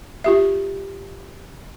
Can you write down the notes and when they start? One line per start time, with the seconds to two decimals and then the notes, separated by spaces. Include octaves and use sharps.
0.24 F4 G4 E5